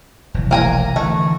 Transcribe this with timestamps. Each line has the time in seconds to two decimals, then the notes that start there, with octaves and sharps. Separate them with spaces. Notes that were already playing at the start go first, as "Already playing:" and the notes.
0.34 F1 B1 E3
0.51 A#3 G#5 A#5
0.96 D3 E3 A3